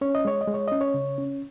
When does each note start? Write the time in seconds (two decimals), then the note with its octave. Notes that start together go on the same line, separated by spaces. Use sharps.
0.01 C#4 C#5
0.15 D#5
0.25 G#3 C#5
0.41 D#5
0.47 G#3
0.54 C#5
0.68 C#4 D#5
0.81 C#5
0.94 C#3
1.18 C#4